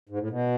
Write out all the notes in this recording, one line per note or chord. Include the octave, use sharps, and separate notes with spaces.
G#2
A2
B2